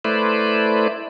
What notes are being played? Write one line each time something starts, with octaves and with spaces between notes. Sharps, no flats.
A3 E4 B4 C5 D5